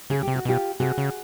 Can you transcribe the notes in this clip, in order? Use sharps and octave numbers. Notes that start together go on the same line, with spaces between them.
C#3 G#4
C3 G4
F#4
B2 F4 G4
C3 F#4 G#4
C#3